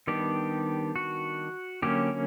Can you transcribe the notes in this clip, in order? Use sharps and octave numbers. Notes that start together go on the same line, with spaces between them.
D#3 G3 B3 D4 G4
F#4
D3 F#3 A#3 C#4 G4